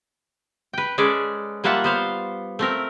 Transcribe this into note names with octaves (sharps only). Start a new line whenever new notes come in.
B4 G5
G#3 C#4 A4 B4 D5
G3 A#3 F4 E5 F#5 A5
B3 C5 F5
A3 C4 A#4